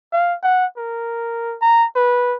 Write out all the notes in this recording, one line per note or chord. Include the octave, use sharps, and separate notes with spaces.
F5
F#5
A#4
A#5
B4